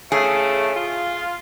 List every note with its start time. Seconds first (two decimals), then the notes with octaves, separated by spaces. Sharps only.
0.12 A2 C#3 A3 G#4
0.76 F4